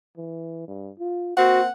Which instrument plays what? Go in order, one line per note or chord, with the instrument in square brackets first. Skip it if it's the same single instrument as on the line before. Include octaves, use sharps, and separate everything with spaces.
[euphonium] E3
G2
F4
[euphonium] A#3 [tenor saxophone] C4 [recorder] F#4 [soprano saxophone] F#5